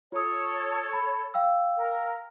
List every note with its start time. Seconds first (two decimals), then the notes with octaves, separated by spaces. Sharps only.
0.12 F4 A4 C#5 D#6
0.93 B5
1.34 F5 G5 E6
1.76 A#4